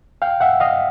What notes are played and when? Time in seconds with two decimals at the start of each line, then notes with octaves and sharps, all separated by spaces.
0.22 F5 G5
0.41 E5 F#5
0.60 D#5 F5